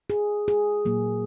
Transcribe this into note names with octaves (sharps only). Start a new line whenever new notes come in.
G#4
G#4
A#2 F#3 A#3